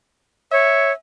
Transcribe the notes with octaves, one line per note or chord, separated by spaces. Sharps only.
C#5 E5